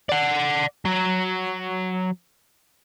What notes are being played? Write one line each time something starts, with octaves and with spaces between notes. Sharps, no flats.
D5 F#5
F#3